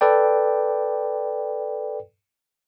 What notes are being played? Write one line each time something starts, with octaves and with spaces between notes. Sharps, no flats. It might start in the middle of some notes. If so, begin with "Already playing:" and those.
A4 B4 D5 G5